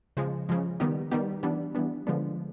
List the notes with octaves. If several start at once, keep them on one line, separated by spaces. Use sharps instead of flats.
C#3 F3 G#3
C#3 F3 G#3
D#3 G3 B3 D#4 G4
D#3 G3 B3 D#4 G4
E3 G3 B3 D4
E3 G3 B3 D4
D3 F3 G#3 B3 D4